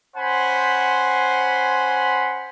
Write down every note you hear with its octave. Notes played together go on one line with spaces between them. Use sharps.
C#4 C5 F#5 G#5 B5 C6